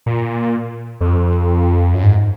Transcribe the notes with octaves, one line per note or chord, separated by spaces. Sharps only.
A#2
F2
F#2
G#2